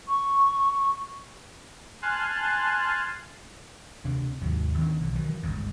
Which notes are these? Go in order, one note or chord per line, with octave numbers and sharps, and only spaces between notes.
C#6
G#5 A5 C6 F6 F#6 A6
D2 C3 D4
D#2 G#2 C3 F#3
D#3 B3 D4
B1 D3
D#3 E3 F#3
G1 C#2 G#2